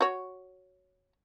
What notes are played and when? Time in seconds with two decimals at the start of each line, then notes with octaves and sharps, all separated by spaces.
0.01 F#4 C#5